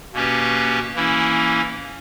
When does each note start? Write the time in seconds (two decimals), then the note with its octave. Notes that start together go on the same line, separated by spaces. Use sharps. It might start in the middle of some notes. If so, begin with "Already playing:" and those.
0.13 B2 A#3 C#4 G4 B4
0.95 E3 A#3 C#4 E4